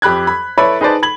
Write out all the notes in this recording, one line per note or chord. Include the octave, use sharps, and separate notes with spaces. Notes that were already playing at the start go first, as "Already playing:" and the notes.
F2 G4 B5 F#6 G#6
B5
E4 A4 B4 C#5 D5 B5
D#4 G#4 B4 C5 D5 A5
B5 G#6 F#7